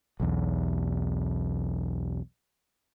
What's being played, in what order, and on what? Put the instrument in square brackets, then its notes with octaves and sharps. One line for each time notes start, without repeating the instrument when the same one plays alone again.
[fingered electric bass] B1 E2